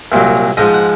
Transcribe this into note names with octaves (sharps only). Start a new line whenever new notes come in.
C2 A#2 F#3
G#2 F3 G#3 D#5
F#5